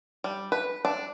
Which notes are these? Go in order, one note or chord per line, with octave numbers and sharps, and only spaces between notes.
G3
B4
D4